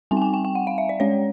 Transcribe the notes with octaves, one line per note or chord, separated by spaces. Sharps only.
G3 C4 D#4 G#5
G5
G#5
G5
G5
F#5
F5
E5
D5
G#3 C#4 C#5